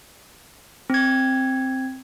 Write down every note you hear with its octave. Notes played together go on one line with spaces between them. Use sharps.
C4 G#6